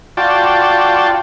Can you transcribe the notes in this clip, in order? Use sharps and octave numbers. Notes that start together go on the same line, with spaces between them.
F4 F#4 D5 G5 A5